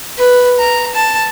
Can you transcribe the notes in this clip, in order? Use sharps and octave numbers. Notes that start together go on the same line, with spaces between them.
B4
A#5
A5